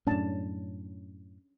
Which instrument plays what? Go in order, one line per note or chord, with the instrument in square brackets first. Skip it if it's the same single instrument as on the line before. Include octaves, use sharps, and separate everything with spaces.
[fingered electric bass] F#2 A2 [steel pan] C#4 D4 A5